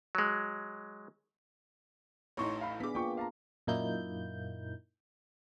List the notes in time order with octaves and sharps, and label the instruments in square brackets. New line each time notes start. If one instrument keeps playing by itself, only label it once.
[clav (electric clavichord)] F#3 G#3
[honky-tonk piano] A1 A2 D#4 [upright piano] C#5 C6 C#6
[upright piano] F5 B5
[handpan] B3 D4 G#4 [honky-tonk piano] D6 B6
[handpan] A#3 F4 [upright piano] G5 C#6
[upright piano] F5 A5 A#5
[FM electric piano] F#2 A#2 A#3 D#4 E4 G6